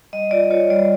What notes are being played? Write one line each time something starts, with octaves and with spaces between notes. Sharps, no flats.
G3 D#5
F4 D5
F4 C#5
G3 D5